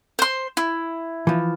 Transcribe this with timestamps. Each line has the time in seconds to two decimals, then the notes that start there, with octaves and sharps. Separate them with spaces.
0.19 C5 C6
0.57 E4
1.27 E3 F3